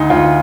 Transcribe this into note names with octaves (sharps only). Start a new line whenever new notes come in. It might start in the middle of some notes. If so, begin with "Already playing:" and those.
Already playing: D2 D#4
D2 F4